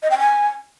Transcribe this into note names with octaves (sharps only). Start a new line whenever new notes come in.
D#5
G5
G#5